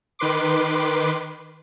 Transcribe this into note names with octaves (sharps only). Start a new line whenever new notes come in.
D#3 B4 C6 D6